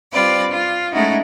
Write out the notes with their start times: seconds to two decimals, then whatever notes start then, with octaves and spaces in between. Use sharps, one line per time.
0.12 G3 C4 F4 B4 D5
0.51 F4
0.92 G#3 A3 C#4 D#4 E4 F#4